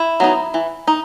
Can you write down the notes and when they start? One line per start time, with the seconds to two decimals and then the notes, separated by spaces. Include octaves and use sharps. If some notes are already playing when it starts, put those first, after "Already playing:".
Already playing: E4
0.20 F#3 B3 D#4
0.54 E3
0.87 D#4